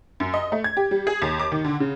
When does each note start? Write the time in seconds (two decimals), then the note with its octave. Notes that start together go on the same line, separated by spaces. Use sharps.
0.20 F#2
0.34 D#5
0.52 A3
0.64 G#6
0.77 G4
0.91 G3
1.07 G#4
1.22 D#2
1.39 D6
1.52 D#3
1.64 D3
1.80 C#3